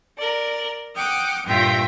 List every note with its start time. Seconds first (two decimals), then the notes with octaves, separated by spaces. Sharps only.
0.17 A#4 D5
0.94 F#5 G5 D6 D#6 F6
1.45 G2 A#2 F4 E5 G5 A#6